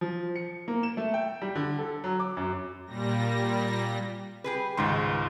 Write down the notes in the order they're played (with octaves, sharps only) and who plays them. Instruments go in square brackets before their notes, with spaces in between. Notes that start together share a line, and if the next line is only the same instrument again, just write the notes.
[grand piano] F3
C#7
A#3
E7
A3
G5
G3
D3
A4
F#3
D6
F#2
[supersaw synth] A#2 G3 A#6
[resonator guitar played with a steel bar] G4 G#4 B4
[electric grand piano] C#2 G#2 C6 [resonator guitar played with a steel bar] D#3 G3